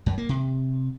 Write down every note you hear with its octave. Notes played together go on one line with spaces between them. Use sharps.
F#2
A#3
C3